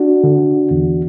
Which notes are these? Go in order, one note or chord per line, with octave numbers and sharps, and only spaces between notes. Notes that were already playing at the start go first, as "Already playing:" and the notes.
Already playing: D4 F#4
D3
E2